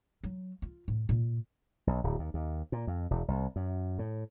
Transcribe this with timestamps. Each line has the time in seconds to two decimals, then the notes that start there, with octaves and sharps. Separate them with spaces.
0.24 F#3
0.62 F4
0.88 A2
1.09 A#2
1.87 B1
2.04 D1
2.19 D#2
2.34 D#2
2.72 A#2
2.87 F2
3.11 E1
3.28 C2
3.56 F#2
3.99 A2